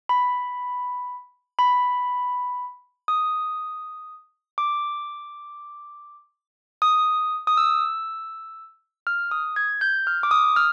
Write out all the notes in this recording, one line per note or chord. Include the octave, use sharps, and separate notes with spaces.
B5
B5
D#6
D6
D#6
D#6
E6
F6
D#6
G#6
G6
F6
D6
D#6
F6